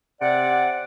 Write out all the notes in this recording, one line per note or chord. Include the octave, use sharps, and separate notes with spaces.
C3 D5 F#5